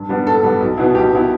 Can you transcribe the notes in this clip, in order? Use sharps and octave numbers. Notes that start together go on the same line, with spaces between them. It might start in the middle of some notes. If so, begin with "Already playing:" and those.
Already playing: G2
G3 B3 D4
G2 A4
G3 B3 D4
B1
B2 B3 E4
B1 G4
B2 B3 E4